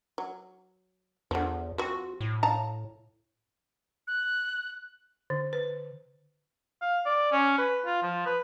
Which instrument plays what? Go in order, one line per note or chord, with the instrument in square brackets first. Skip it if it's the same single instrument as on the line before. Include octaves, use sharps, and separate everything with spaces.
[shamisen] F#3
[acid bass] E2 [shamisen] D3 F3
[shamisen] F3 C4 [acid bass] F#4
[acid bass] A2
[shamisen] F5 A5 A#5
[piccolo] F#6
[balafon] D3
B4
[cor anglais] F5
D5
C#4
B4
F4
F3
B4